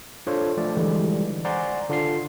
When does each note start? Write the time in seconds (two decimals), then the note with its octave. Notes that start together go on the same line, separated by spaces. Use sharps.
0.27 D4 F4 A4 C5 C#5
0.57 F3 A3 D5
0.77 D3 E3 G3 G#3
1.45 C5 D5 F#5 G#5 A#5 C6
1.89 D3 D4 F4 C6 C7